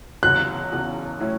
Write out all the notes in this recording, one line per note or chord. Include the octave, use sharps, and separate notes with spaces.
F#1 E2 C#3 F#3 C#4 F#6
F#1 E2 C#3 F#3 C#4
A2 F#3 C#4 E4